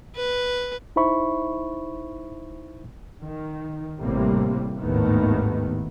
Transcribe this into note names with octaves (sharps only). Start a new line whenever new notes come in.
B4
D#4 E4 C5 E5 B5 C#6
D#3
A1 A2 C3 G3 A#3 C4
G#1 D#2 A2 D#3 A3 B3